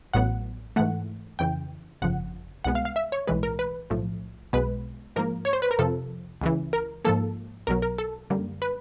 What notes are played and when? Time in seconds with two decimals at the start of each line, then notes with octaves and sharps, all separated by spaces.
0.13 A1 A2 F#3 B3 F#5
0.76 G#2 E3 A3 F#5
1.39 F2 C#3 E3 G5
2.02 G1 F2 C#3 F3 F#5
2.64 C2 B2 G#3 B3 F#5
2.75 F5
2.85 F5
2.96 E5
3.12 C#5
3.27 B1 A2 E3 G#3 B4
3.43 A#4
3.59 B4
3.90 B1 A2 F3 A3
4.53 B1 B2 G#3 B3 B4
5.16 G#2 F3 A#3 A#4
5.45 C#5
5.53 C5
5.62 B4
5.71 A#4
5.78 F2 C3 F3 A4
6.41 C#2 C#3 E3
6.73 A#4
7.05 G#2 F3 A#3 A4
7.67 B1 B2 F#3 A#4
7.82 A#4
7.98 A4
8.30 F#2 D3 G3 A#3
8.62 B4